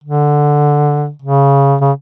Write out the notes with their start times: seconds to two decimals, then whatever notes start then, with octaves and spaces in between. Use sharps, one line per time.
0.04 D3
1.22 C#3
1.81 C#3